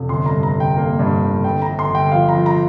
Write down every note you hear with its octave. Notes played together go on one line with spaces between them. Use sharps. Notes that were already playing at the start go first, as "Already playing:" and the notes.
Already playing: F1
G1 C6
A#5
G2
A#5
G1
G5
A#3
G2
G1
G1 G5
A#5
G1
C6
G1 G5
F3 F5
A#5
F3
A#5